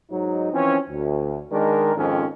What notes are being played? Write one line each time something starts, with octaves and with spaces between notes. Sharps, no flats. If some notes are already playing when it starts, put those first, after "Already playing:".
G#2 F#3 D#4
E3 F3 C4 C#4
D2
D#3 G#3 D4 A#4
F2 G#2 D#3 C4 C#4